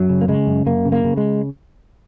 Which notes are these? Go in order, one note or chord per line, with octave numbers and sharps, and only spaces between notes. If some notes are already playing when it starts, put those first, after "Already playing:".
Already playing: F#2 F#3
C#3
A#3
C#3 G#3
F#2
F#2 A#3
C#3
A#3
C#3
G#3